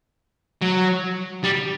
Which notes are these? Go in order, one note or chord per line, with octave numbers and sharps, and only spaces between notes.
F#3
G3